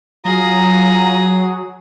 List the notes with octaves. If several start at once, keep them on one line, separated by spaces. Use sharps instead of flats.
F#3 F4 G#4 F5 A#5 D#6